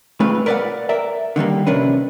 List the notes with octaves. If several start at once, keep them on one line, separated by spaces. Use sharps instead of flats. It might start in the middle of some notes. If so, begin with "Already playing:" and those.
G#2 G#3 A3 C4 F4 B4
A#4 B4 D5 D#5 F5 F#5
A#4 D5 E5
D3 D#3 G3 A#3
F2 C3 C#4 D4 A#4 B4